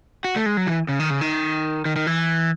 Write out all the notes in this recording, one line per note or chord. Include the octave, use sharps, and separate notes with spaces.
F#4
A3
G#3
F#3
E3
C#3
D#3
C#3
D#3
D#3
D#3
E3